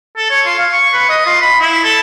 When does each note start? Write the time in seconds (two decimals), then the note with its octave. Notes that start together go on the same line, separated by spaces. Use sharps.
0.17 A4
0.30 C#5
0.46 F4
0.58 F5
0.73 C#6
0.93 B4
1.09 D#5
1.26 F4
1.41 B5
1.60 E4
1.84 A4